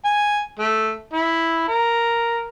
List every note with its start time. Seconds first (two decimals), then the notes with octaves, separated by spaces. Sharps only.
0.05 G#5
0.59 A3
1.13 E4
1.68 A#4